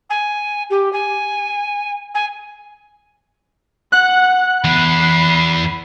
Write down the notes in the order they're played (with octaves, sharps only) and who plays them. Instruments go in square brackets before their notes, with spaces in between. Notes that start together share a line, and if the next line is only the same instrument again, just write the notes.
[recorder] G#5
G4
G#5
G#5
[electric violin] F#5 [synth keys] F#6
[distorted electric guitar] E2 [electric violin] B5 C7